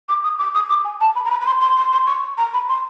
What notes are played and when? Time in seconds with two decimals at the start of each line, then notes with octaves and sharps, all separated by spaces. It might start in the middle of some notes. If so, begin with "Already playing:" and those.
0.09 D6
0.24 D#6
0.39 D6
0.55 D#6
0.69 D6
0.84 G#5
1.00 A5
1.15 B5
1.25 A#5
1.30 B5
1.41 B5
1.46 C6
1.61 C6
1.77 C6
1.92 C6
2.07 C#6
2.37 A#5
2.53 B5
2.69 C6